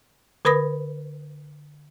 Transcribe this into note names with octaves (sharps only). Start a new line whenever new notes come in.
D3 A#4 B4 B5 D#6 A#6